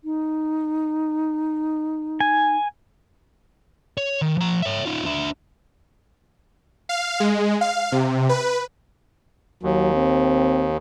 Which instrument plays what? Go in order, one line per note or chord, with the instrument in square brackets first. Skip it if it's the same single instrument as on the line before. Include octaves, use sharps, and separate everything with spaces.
[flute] D#4
[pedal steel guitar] G#5
[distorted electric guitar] C#5
D#3
F3 A#5
C#5 E5
D#4 F4
D4 E5
[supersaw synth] F5
G#3
F5
C3
B4
[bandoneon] D#2 [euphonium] F#3
[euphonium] C4